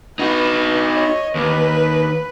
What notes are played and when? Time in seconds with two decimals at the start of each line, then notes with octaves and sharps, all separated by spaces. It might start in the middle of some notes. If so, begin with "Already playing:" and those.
0.19 D#4 F#4 B4
0.93 C#5 D#5
1.35 D#2 B4